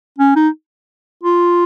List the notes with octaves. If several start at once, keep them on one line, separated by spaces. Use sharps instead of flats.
C#4
D#4
F4